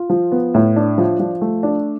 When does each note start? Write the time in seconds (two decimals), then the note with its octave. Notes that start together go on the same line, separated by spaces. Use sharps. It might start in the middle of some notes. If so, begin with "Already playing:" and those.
Already playing: F4
0.10 F3
0.32 B3
0.54 A2
0.76 D4
0.98 F3
1.20 F3
1.41 A3
1.63 D4